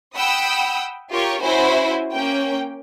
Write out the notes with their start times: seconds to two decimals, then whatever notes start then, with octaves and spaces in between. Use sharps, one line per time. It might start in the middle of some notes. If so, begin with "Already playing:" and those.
0.16 F#5 G5 B5 D#6 E6
1.11 F4 G4 A#4 C#5 C#6
1.42 C#4 E4 F#4 C5 G#5
2.12 A#3 C#4 G5